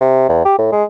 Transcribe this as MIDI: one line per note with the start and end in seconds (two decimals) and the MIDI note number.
0.01 0.26 48
0.29 0.42 40
0.45 0.56 67
0.58 0.67 45
0.72 0.84 56